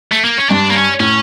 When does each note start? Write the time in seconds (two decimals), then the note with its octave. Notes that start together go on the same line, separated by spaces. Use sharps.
0.12 A3
0.24 A#3
0.38 C#4
0.49 G2 D4
0.70 A#3
0.75 C#4
1.00 A2 C#4